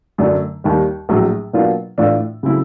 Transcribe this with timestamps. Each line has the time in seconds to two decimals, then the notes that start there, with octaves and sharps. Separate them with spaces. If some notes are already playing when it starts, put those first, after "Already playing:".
0.18 F#2 D3 F#3 A3 D4
0.64 D#2 D#3 G3
1.09 A#1 A2 F#3 A3
1.53 B2 F#3 A#3 D4 F4
1.98 A2 E3 A3 D4 F4
2.43 C#3 F#3 A3 C4 E4